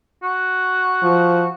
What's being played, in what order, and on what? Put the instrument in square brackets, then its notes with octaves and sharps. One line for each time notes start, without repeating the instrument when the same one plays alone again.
[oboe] F#4
[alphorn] F3